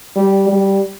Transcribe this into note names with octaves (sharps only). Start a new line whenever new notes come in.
G3
G3